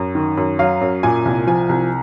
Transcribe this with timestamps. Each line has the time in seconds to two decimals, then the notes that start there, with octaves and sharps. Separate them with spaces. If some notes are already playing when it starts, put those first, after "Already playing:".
Already playing: F#2
0.15 D#3
0.37 F#2
0.59 F#3 F5
0.81 F#2
1.03 A#2 G#5
1.25 C2
1.47 F3 G#5
1.69 C2